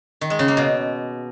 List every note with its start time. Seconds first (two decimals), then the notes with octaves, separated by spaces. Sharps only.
0.21 D#3
0.30 G#3
0.39 C#3
0.48 A#3
0.57 B2